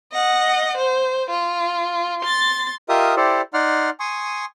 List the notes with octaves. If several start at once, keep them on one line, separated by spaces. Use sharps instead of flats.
D#5 F#5
C5
F4
C6 A6
F4 G4 A#4 D#5 E5 D#6
E4 G4 A4 C5 D5
D#4 D5 F#5 C6 F6
G#5 C6 C#6 D#6